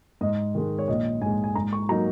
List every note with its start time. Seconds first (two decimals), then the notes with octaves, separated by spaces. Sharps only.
0.21 G#2 D#5
0.55 D#3 G#3
0.79 C#5
0.88 A#1 D#5
1.21 G#2 G#3 G#5
1.44 G#5
1.55 G#2 A#5
1.73 C#6
1.89 F#3 A#3 D#4 A#5